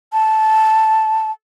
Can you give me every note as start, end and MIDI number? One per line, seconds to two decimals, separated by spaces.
0.13 1.31 81